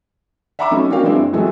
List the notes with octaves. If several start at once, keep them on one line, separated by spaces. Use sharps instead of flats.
E5 F#5 A#5 B5 D6 E6
F#3 A3 C#4 D#4
C#4 D4 F#4 A#4 F5 G5
E3 F#3 G#3 C4 D4 E4
F#1
A2 E3 F#3 G#3 A3